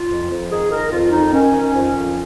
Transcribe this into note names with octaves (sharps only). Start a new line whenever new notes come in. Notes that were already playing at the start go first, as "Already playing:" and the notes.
Already playing: F4
F2
F2
D#3 G#4
D#3 A#4
F2 F4
F2 D#4
D#3 C#4
D#3
F2
F2